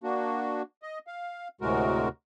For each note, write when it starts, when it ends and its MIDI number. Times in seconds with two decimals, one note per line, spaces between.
0.03 0.62 58
0.03 0.62 62
0.03 0.62 66
0.82 0.99 75
1.07 1.48 77
1.61 2.08 38
1.61 2.08 45
1.61 2.08 48
1.61 2.08 56
1.61 2.08 66
1.61 2.08 70